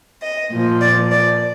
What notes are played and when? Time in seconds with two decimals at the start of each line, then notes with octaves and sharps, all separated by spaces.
0.21 D#5
0.51 A#2 F3
0.81 D5
1.11 D5